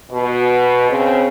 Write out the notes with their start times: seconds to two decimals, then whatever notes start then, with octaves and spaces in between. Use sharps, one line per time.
0.11 B2
0.89 C#3 C4